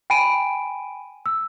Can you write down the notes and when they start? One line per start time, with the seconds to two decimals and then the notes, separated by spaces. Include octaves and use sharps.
0.10 G5 G#5 B5 D7 D#7
1.26 E6